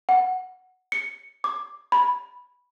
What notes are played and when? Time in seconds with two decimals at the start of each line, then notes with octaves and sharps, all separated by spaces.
0.09 F#5
0.92 C#7
1.44 D6
1.92 B5